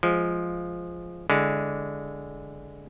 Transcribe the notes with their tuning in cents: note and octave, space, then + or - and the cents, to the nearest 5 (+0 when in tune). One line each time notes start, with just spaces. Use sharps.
F3 +0 G#3 +5
D3 -15 G#3 -10 E4 +0